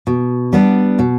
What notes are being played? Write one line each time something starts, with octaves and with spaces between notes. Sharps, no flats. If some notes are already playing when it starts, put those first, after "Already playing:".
B2
G3 B3 D4
B2